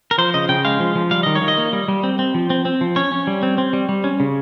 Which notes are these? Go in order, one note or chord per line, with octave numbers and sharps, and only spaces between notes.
A#4
F3 C5
C#3 D#5
C#3 G5
G#3 F5
F3
F3
G3 F5
D#3 D#5
C#5
D#3
D#5
A#3
G3
G3
C4
C4
F3
C4
C4
F3
C#4 C#5
C#4
G3
C4
C4
G3
G3
C#4
C#3